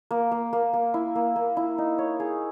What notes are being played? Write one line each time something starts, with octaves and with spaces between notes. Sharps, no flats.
A#3
A#3
A#3
A#3
E4
A#3
A#3
E4
D#4
C#5
G#4